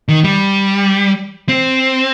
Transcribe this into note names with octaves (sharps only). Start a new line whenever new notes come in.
D#3
G3
C4